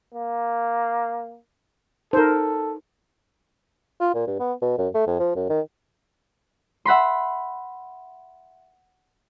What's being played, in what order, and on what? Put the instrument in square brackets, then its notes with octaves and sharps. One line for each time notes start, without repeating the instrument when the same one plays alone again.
[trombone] A#3
[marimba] D#4 [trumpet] A4 [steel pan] A#4 C5
[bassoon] F4
A#2
G2
B3
B2
F#2
A3
F2
F3
F#2
D#3
[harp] E5 F#5 B5 C6